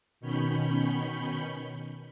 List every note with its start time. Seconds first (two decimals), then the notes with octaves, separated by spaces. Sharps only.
0.20 B2 D#3 C#4 C#5 B5 G6